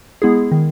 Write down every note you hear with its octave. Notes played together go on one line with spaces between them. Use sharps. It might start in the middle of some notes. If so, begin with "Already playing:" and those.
G#3 B3 E4 G#4
D#3